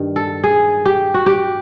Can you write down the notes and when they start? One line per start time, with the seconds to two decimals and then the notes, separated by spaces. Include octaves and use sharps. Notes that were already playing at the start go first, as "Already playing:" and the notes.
Already playing: G2 D#3
0.16 A4
0.44 G#4
0.85 G4
1.14 F#4
1.26 G4